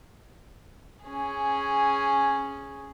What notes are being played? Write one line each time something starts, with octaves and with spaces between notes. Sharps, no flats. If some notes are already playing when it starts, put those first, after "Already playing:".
C#4 G#4